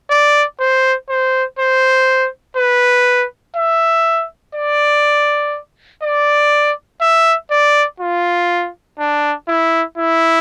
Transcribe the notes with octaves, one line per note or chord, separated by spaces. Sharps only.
D5
C5
C5
C5
B4
E5
D5
D5
E5
D5
F4
D4
E4
E4